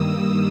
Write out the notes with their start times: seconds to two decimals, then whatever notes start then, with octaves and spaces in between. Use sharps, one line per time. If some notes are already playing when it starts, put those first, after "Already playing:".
Already playing: G2 D#3 G3 A#3 D#6 E6